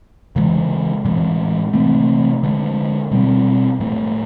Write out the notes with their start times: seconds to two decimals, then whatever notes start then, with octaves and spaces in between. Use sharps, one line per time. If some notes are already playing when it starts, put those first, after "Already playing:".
0.36 C#3 E3 G#3
1.05 A2 E3 G#3
1.74 C3 E3 A3 C4
2.43 D3 F3 G#3
3.11 B2 G3 C4
3.80 A2 F3 A3